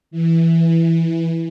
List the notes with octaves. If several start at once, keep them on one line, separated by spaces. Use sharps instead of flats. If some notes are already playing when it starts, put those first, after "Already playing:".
E3